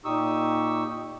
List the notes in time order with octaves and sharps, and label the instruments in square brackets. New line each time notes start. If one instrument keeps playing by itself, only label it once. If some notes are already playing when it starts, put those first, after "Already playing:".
[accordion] A#2 D#4 G4 C#6 D#6 E6